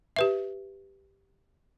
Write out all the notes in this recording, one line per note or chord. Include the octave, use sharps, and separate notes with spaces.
G4 B4 E5